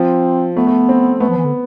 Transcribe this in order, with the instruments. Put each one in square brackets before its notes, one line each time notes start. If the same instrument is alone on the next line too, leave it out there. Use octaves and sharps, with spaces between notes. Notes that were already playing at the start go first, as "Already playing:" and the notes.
Already playing: [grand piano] F3 [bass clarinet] C4
[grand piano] A3 [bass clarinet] B3
[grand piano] A3
C4
[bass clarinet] A3 [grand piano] B3
[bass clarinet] F3
E3
D3